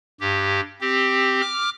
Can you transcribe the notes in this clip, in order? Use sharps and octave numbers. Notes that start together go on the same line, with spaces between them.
G2 G4
C4 G4
D6 F6